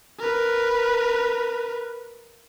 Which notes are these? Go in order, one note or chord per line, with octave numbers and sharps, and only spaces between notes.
A#4 B4